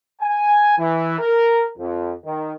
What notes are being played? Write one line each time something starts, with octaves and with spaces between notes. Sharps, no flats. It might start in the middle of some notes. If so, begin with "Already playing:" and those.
G#5
E3
A#4
F2
D#3